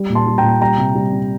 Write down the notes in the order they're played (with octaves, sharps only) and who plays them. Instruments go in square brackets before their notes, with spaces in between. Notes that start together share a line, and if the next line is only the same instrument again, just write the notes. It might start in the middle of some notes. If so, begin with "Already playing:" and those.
Already playing: [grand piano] G3
A#2
A5 C6
G3
G5 A#5
A#2
G3 G5 A#5
C3
G3
C3